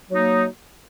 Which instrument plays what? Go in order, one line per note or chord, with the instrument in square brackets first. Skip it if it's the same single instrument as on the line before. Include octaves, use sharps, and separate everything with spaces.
[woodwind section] F#3 A#3 D#4